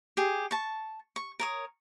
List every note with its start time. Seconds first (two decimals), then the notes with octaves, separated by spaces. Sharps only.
0.17 G4 G#4
0.51 A5 C#6
1.16 C#6
1.39 A#4 C#5 D#6